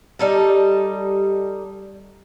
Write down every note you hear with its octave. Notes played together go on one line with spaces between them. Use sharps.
G3 D#4 A4